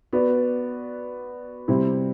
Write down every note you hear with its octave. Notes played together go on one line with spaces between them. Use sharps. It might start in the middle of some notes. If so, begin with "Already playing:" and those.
B3 F#4 B4 D5
C3 G3 C4 E4